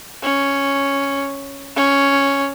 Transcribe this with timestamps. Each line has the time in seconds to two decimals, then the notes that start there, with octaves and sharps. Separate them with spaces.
0.23 C#4
1.76 C#4